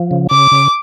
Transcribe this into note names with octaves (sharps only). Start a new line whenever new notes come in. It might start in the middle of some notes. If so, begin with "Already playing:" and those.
Already playing: F3
C#3
C#3 D6
C#3